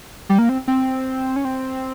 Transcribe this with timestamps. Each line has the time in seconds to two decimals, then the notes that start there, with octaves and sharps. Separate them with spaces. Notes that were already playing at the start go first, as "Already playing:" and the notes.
0.29 G3
0.39 A#3
0.49 C4
0.68 C4
1.36 C#4
1.45 C4